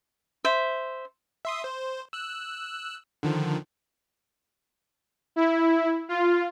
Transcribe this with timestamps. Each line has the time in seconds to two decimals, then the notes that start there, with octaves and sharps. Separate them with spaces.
0.45 C5 E5
1.45 E5 C6 D#6
1.64 C5
2.13 E6 F#6
3.23 D3 D#3 F3
5.36 E4
6.09 F4